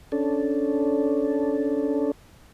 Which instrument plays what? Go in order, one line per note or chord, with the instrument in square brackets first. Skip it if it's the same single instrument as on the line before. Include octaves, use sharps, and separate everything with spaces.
[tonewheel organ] C#4 D4 A4